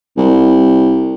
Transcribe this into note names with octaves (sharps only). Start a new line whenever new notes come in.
C2